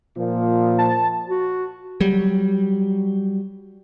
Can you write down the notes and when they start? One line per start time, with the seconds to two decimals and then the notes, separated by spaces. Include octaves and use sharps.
0.17 A#2 F3
0.78 A5
1.28 F#4
2.01 F#3 G3